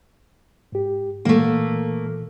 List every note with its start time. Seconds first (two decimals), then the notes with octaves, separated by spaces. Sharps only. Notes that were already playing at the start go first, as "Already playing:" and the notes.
0.72 G#2 G4
1.25 A#2 E3 A3 A#3